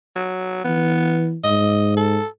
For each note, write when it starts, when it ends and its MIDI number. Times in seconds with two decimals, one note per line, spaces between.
0.16 0.62 54
0.65 1.37 52
0.65 1.31 59
1.44 2.19 44
1.44 1.93 75
1.97 2.27 69